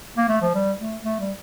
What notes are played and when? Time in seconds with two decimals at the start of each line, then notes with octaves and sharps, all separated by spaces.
0.17 A#3
0.29 A3
0.41 F3
0.54 G3
0.79 A3
1.04 A3
1.20 G3